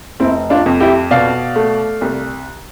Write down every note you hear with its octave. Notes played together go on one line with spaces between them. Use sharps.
F1 C4 E4
D4 F4
F2
E4 G4
B2 D5 F5
A3
C2